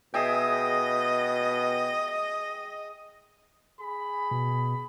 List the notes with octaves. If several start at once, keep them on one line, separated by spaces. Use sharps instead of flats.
B2 G#4 D#5 E5 G5
G#4 B5
B2